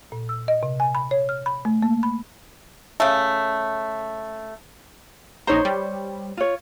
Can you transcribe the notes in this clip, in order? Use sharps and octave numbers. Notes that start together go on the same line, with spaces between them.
A#2
E6
D#5
C3
G#5
B5
C#5
F6
B5
A3
A#3
B5
C#3 A3
A#1 D#4 C5 C#5 A#5
G3
F4 C#5